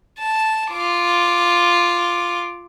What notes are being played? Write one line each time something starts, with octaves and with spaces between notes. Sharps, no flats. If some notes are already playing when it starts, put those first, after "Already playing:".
A5
F4 D6